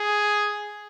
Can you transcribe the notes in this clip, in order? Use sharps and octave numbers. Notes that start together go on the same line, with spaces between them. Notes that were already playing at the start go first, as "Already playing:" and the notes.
Already playing: G#4